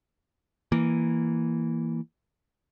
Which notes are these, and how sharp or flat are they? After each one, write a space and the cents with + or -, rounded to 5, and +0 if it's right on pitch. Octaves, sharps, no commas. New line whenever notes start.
E3 +0 A#3 +0